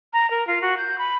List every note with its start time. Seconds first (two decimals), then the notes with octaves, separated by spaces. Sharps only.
0.13 A#5
0.31 A#4
0.47 F4
0.62 F#4
0.77 G6
0.98 B5